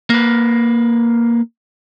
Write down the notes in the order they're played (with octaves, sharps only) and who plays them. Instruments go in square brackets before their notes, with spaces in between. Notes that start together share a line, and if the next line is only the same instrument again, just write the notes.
[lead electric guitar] A#3 B4